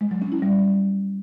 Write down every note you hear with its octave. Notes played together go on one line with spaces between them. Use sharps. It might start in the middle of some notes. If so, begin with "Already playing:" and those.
G#3
F#3
C#4
E4
G3